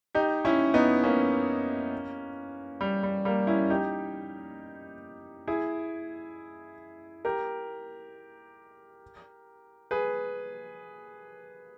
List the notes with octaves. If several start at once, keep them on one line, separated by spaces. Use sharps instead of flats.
D#4 G4
C#4 E4
B3 D#4
A#3 C#4
G3
G3
G3 A#3
C#4 E4
D#4 G4
E4 G#4
G4 A#4
G#4 B4